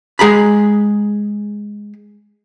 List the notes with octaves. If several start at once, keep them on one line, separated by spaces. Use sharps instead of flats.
G#3 G#4 A#5 B5